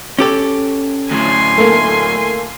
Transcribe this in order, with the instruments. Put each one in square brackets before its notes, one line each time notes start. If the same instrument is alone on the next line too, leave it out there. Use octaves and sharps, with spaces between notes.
[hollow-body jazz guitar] C#4 G4 A4
[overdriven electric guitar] D2 A2 [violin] G#5 C6
[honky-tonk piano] A3 A#3